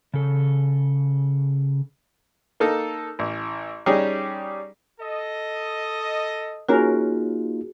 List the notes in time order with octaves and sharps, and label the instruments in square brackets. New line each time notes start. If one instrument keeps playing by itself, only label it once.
[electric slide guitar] C#3 A4
[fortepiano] A#3 D#4 A4
A1
G3 C#4 D#4 G4 G#4
[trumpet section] A4 D#5
[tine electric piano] A#3 D#4 F4 [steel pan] C#4 A#4 [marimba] F#4 G#4